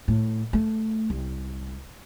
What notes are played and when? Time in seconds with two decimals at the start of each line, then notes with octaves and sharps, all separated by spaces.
0.08 A2
0.53 A3
1.10 C2